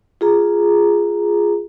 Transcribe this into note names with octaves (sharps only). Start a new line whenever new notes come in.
F4 G#4 A#5